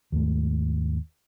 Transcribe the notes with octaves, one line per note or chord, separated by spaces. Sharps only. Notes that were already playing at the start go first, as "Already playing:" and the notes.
D#2 G#2 A3